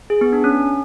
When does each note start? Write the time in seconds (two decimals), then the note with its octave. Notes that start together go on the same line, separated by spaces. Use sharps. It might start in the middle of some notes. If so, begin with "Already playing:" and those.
0.10 G#4
0.21 B3
0.33 D4
0.44 C#4